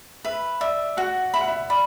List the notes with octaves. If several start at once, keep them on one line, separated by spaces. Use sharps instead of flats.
B4 E5
D5 E5
F#4 F#5
E5 B5
F#5
E5
D5 B5